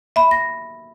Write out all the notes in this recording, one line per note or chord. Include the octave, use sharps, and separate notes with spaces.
E5 B5
A#6